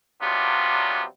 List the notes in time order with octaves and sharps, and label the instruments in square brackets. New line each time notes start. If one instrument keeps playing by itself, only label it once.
[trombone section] C3 F#3 G3 B3 D4 F4